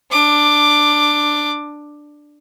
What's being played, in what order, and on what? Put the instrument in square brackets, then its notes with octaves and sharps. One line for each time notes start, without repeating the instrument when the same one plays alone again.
[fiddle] D4 D6